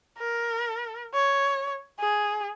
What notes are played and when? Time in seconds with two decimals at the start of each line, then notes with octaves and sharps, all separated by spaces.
0.18 A#4
1.14 C#5
2.00 G#4